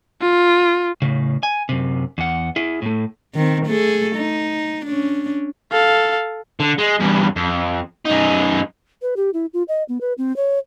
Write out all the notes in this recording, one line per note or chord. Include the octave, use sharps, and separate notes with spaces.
F4
A2 C#3
G#5
F#2 C3
E2 F#5
E4 G#4
A2 A3
D#3 C4
A3 G#4 A4
D#4
C#4 D4
A4 F5
D3
G#3
E2 G2
F2
F#2 D#4
B4
G4
E4
F4
D#5
B3
B4
C4
C#5